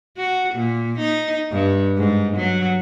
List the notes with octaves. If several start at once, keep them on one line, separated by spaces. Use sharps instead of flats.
F#4
A#2
D#4
G2
G#2
F#3